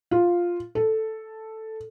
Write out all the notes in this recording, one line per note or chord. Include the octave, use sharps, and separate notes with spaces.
F4
A4